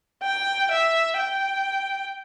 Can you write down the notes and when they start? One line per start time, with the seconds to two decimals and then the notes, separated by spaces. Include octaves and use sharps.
0.23 G5
0.72 E5
1.18 G5